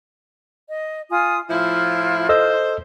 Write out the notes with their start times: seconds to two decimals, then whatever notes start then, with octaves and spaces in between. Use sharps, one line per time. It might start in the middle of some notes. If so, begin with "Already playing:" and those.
0.68 D#5
1.11 F4 G#5 D#6
1.50 A2 F3 E4 F4
2.29 A4 C5 D#5 E6